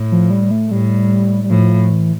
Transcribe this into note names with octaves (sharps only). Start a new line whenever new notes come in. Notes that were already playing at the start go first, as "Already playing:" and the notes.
Already playing: A2
F3
G3
A3
A2 G3
G3
A2 F3
E3